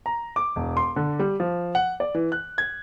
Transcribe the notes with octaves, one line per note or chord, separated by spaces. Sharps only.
A#5
D6
E1
C6
D3
G3
F3
F#5
D5
E3
F#6
G#6